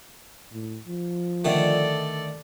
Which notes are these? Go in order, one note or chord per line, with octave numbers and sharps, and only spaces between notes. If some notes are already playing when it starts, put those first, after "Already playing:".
A2
F3
D3 D#3 A3 A4 D5